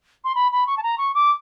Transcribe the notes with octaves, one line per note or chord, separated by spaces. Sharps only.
C6
B5
B5
C#6
A5
A#5
C#6
D6